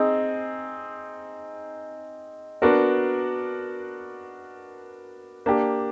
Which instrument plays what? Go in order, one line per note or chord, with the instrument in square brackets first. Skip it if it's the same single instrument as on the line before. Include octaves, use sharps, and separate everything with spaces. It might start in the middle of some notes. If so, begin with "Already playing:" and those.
Already playing: [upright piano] C4 D#4 G#4
B3 D4 F#4 A#4
A#3 D4 G4